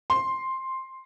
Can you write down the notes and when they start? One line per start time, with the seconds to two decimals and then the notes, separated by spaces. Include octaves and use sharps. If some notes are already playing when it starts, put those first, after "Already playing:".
0.10 C6